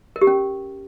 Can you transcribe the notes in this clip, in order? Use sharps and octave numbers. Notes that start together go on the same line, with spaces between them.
A#4
G4
C#4